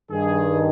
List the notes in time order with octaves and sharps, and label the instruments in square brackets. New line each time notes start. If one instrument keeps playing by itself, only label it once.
[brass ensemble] G2 D#3 G#4